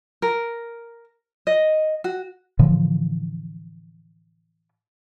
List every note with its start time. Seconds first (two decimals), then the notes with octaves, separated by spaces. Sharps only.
0.22 A#4
1.47 D#5
2.04 F#4
2.59 A2 D3 E3 F3